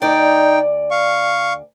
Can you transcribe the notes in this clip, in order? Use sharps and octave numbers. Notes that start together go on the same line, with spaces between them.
D2 D#4 D5 G5
F5 C#6